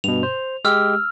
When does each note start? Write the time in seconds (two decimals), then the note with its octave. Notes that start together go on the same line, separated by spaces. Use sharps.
0.04 G2 B2 F7
0.23 C5
0.65 G#3 G4 E6 F6